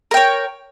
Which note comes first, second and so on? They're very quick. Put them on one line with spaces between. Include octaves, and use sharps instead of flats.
A#4 G5 C#5